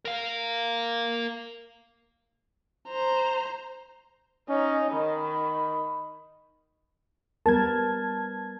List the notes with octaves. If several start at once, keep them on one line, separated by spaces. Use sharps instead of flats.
A#4 F5
C5 A#5
C#4 D#4
D#3 B5
G3 B3 A#4 A5 G#6